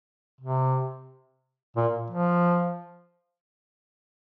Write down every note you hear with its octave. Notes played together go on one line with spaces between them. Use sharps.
C3
A#2
F3